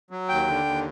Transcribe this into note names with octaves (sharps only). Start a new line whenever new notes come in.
F#3
D#2 G5
D3
D#2